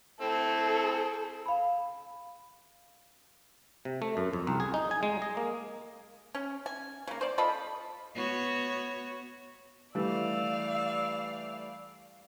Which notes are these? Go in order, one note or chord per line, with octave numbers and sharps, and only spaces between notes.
A3 C4 E4 A4
F5 B5
C3
A3
F#2
F2
C2
G#4
D#4
G#5
G#3
D#5
A#3
C#4
G#5
C#3 A#3
C5 D5
F4 A4 D#5 B5
B3 F#4 C#5
E3 G3 A3 D5 F5 E6